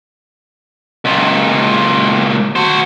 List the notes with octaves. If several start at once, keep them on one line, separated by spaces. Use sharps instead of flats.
C#2 A#2
F#4 C5